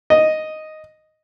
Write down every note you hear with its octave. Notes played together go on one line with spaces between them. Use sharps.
D#5